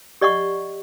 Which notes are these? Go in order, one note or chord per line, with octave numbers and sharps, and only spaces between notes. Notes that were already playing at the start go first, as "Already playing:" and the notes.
G4 D5 D#5 F#5 C#6